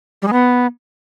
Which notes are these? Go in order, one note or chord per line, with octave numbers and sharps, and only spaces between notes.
G3
G#3
B3